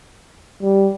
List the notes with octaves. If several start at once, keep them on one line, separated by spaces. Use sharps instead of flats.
G3